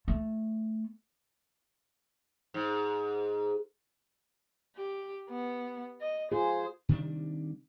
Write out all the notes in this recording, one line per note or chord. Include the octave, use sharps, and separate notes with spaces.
A3
G#2
G4
B3
D#5
F4 G#4 C5
C3 D#3 G3 D4